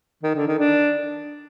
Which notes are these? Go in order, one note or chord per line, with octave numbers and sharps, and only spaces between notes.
D#3
D3
D#3
D4